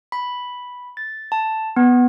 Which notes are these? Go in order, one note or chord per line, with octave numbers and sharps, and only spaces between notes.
B5
A6
A5
B3